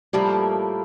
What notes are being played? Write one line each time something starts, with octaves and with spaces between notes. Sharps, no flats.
A2 F3 G3 A#3 E4